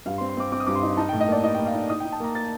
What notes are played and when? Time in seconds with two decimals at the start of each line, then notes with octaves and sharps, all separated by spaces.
0.05 G2 F5
0.18 C6
0.21 C4
0.29 C6
0.37 C4 D6
0.52 C4 D6
0.60 D#6
0.66 G2 D6
0.75 C6
0.83 D#4
0.97 D#4 A5
1.09 A2 G5
1.20 D#5
1.28 A#3 D5
1.43 D#4 D#5
1.54 A#3 G5
1.66 F5
1.74 D#4
1.89 D#4 D#6
2.00 D#4 G5
2.12 A5
2.20 A#3 A#5
2.35 A#3 A6